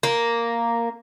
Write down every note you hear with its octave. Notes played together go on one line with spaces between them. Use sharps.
A#3